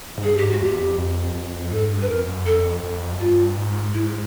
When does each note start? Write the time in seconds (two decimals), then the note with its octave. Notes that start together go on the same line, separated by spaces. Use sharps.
0.18 G#2
0.24 G2 G#4
0.37 G#2 G4
0.51 F#4
0.61 E2 G4
0.79 F2
0.98 F2
1.35 F2
1.72 G#2 A4
1.90 G2
2.02 B4
2.09 F2 A#4
2.28 F#2
2.46 F2 A4
2.83 F2
3.13 F#2
3.20 G2 F4
3.57 G#2
3.94 G#2 E4